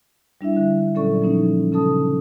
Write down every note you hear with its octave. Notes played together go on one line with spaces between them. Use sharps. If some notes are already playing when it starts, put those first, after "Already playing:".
G3 D4 E4 E5
D3
A#2 F#3 C#4 A4 D5 C#6
F3 A#3 C#4 D#4
C#3 C#4 D#4 A4 A5 D#6